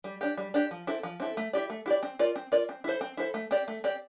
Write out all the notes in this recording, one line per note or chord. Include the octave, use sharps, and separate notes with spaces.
G3
D4 G4
G3
D4 G4
F3
C4 E4 A4
F3
C4 E4 A4
A3
E4 G4 D5
A3
E4 G4 D5
C4
F4 A#4 D5
C4
F4 A#4 D5
C4
E4 A4 C5
C4
E4 A4 C5
A3
C4 G4 D5
A3
C4 G4 D5